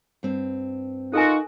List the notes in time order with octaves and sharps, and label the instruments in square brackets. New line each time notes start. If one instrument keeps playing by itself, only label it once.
[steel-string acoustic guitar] G2 C4
[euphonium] D#4 [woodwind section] F4 F#4 [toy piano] A4 A#4 G#5